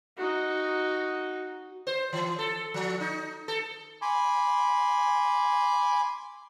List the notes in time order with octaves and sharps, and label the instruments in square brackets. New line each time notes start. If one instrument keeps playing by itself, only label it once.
[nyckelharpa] D#4 F#4
[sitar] C5
E3
A4
F3
D#4
A4
[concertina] G#5 B5 C6 D6